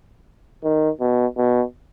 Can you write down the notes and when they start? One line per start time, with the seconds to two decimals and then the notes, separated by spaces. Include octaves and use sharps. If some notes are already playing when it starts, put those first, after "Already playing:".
0.63 D#3
1.00 B2
1.37 B2